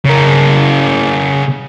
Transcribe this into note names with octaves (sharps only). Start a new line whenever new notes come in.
C#3 A#4